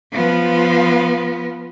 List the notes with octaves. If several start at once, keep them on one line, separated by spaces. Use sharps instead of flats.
F3 B3